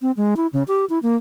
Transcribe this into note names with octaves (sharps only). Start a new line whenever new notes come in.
C4
G#3
E4
C#3
G4
E4
A#3